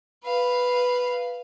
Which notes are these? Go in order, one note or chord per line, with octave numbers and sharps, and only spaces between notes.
B4 F5